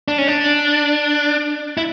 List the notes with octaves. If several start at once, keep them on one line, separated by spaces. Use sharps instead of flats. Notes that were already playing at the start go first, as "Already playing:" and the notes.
D4
C#4
D4
E4